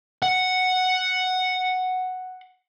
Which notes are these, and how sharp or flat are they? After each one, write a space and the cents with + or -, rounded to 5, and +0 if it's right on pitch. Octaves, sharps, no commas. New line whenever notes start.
F#5 +0